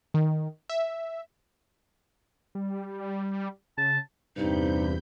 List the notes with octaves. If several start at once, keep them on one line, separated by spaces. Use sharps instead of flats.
D#3
E5
G3
C#3 A5
E2 G2 C3 C4 D#4 B5 G6